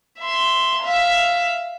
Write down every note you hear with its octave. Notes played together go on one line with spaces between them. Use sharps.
E5 C6
E5 F5